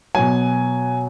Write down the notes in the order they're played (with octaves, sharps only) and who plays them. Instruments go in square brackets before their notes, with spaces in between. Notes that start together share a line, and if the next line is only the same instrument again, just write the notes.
[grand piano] B2 F#3 G#5